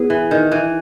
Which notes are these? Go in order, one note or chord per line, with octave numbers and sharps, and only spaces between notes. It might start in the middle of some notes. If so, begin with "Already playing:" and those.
Already playing: B3 E4 G#4 B4
E3
D#3
E3